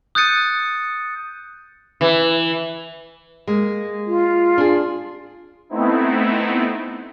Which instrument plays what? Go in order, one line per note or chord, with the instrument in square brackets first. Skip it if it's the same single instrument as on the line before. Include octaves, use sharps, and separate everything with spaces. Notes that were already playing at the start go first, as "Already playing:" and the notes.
[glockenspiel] D#6 F#6 G6 A6 C#7 D#7
[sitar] E3
[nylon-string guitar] G#3 A#3
[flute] F4
[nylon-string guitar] D4 G#4
[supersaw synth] A3 B3 C4 D#4 E4